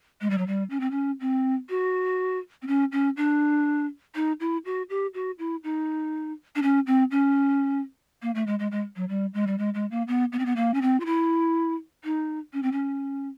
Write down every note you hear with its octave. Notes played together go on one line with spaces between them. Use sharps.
G#3
G3
F#3
G3
C#4
C4
C#4
C4
F#4
C4
C#4
C#4
D4
D#4
E4
F#4
G4
F#4
E4
D#4
D4
C#4
C4
C#4
A#3
A3
G#3
G#3
G#3
F#3
G3
G#3
G3
G#3
G#3
A#3
B3
B3
C4
B3
A#3
C#4
C4
F4
E4
D#4
C#4
C4
C#4